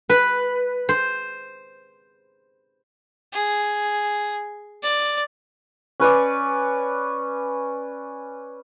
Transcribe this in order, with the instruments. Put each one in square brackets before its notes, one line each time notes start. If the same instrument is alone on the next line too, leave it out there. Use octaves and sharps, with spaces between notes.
[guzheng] B4
C5
[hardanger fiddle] G#4
D5
[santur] C#4 B4 C#5 D5